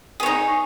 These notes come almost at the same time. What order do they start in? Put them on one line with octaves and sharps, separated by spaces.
G#4 C#5 D#4